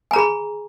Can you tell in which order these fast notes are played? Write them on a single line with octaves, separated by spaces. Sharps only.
G#5 A#5 G#4 B5